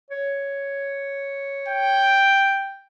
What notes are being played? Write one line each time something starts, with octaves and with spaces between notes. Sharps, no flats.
C#5
G5